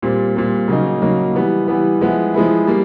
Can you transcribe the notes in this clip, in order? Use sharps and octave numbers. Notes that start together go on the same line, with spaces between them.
A#2 G3 C4
A#2 G3 C4
C#3 F#3 A#3 D#4
C#3 F#3 A#3 D#4
E3 G3 B3
E3 G3 B3
F3 G#3 B3 E4
F3 G#3 B3 E4
G3 A#3